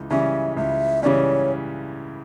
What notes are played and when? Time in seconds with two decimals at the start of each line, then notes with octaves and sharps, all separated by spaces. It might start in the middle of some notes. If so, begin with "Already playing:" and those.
Already playing: C#2 E3
0.10 C#3 E3 G3 C#4 E5
0.57 C#2 E5
1.03 C#3 E3 G3 C#4 C#5 D5